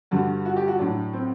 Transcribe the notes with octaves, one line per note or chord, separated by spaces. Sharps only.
G2 D3 G3 F#4
F#4
G4
F#4
A2 F#3 D4
C4